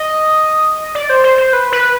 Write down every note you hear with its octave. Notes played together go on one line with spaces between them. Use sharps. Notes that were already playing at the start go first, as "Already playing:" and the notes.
Already playing: D#5
D5
C5
C5
C5
B4
B4